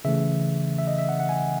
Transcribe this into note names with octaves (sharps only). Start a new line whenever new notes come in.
C#3 E3 A3 E5
E5
D#5
E5
F#5
F#5
G#5